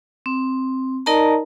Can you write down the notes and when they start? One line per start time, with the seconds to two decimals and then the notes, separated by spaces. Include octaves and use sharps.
0.26 C4
1.06 D#4 A#4 D5 D#5 A5 A#5